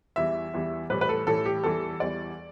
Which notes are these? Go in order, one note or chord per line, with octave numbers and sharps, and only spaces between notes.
E2 E3 G3 E5
E2 E3 G3
A2 E3 G3 B4
B4
A4
A2 E3 G3 A4
G4
E2 E3 G3 A4
E2 E3 G3 D5